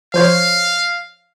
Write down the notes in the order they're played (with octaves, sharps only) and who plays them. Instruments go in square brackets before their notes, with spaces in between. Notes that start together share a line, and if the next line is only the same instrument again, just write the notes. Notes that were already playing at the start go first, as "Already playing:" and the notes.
[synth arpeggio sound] F3 C5 C#5 [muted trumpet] F5